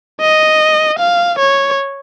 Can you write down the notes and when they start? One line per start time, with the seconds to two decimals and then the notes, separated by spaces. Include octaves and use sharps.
0.21 D#5
0.99 F5
1.38 C#5